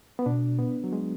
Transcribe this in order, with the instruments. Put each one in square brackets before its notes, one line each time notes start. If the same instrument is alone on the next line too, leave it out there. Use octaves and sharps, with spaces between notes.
[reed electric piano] B3
[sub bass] B2 [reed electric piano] D4
[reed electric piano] B3
F#3
G#3